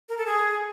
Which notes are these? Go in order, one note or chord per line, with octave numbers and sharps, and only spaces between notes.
A#4
A4
G#4